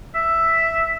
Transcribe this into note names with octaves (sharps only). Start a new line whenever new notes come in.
E5